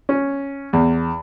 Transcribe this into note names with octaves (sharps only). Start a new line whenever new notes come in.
C#4
E2